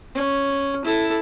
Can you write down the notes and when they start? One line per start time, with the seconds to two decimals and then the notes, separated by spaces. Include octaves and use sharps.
0.15 C#4
0.85 E4 A4